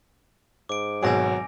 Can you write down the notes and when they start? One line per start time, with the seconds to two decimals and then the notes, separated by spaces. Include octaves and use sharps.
0.69 G#2 D6 D7
1.03 G#1 B2 F#3 G#4 G#5 A#6 D7